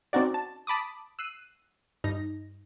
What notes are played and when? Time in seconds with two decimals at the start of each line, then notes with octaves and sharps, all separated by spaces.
0.13 C4 C#4 D#4 F#4 D5
0.34 A5
0.67 A5 B5 D6 D#6
1.19 E6 F#6 C7 D#7
2.04 G2 D#4 A#6